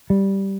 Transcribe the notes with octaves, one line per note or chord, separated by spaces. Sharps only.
G3